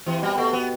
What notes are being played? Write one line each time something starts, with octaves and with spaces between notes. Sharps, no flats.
C3 E3
B2 G3
B2 A3
B3